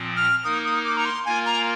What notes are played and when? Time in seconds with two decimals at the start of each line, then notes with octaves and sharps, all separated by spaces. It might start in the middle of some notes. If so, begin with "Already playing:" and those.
Already playing: A#2 F3 C4
0.17 F6
0.44 A#3 D#4 A#4 D#6
0.65 D#6
0.84 D6
0.97 A#5
1.05 C6
1.25 A#3 F4 A#4 G#5
1.46 A#5